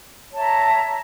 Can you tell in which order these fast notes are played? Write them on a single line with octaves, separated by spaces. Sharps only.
C#5 A5 E5 A#5